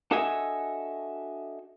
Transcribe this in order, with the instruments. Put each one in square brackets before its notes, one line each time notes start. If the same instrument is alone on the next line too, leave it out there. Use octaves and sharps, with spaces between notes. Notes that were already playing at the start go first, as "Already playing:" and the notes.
[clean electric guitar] D4 F#4 A4 D#5 E5 G#5